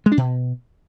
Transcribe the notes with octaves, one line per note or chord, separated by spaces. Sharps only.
G#3
D4
B2